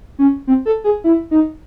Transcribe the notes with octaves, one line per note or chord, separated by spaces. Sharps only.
C#4
C4
A4
G#4
E4
D#4